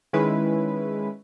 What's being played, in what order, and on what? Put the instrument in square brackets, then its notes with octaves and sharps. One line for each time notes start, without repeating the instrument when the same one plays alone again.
[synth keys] D#3 G#3 C#4 E4 B4